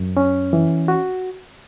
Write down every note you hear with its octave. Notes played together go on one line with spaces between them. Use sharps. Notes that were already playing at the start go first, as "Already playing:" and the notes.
Already playing: F#2
C#4
E3
F#4